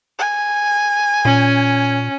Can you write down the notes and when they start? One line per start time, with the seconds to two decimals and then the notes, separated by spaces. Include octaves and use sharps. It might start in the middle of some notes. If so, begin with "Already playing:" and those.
0.19 G#5
1.25 A#2 C#4